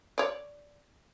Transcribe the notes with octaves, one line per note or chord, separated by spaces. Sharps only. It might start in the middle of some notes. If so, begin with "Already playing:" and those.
C#5 D5